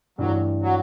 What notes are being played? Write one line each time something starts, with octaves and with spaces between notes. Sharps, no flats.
G2 E3 F#3 A3
F#3